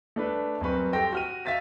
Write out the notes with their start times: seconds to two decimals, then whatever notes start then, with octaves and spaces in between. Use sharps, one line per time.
0.16 A3 D4 B4
0.61 F#2 G3 C4 B4 C#6
0.93 G4 A4 G5 C6 A#6
1.13 F#4 F6 D#7
1.45 E5 F5 A6 B6 D#7